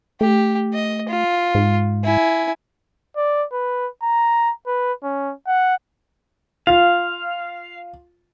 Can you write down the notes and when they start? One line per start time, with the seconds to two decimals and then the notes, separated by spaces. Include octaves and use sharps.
0.21 A3 G4
0.74 D#5
1.09 F4
1.55 G#2
2.04 E4 G#5
3.16 D5
3.53 B4
4.03 A#5
4.67 B4
5.03 C#4
5.47 F#5
6.67 F4 F5